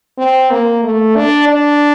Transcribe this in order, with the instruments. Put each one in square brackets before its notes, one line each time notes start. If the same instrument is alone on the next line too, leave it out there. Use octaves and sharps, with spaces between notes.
[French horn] C4
A#3
A3
D4
D4